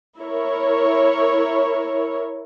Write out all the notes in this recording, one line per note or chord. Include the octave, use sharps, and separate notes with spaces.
E4 A#4 C#5